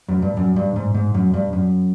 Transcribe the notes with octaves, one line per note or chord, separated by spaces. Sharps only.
F#2
G2
F#2
G2
G#2
G#2
F#2
G2
F#2